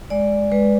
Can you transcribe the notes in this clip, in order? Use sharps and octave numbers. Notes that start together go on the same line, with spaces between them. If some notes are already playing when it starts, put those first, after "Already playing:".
G#3 D5
G#3 B4